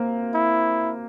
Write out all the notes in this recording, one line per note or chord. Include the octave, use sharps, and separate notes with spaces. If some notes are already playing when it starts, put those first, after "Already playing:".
Already playing: A#3 C4
E4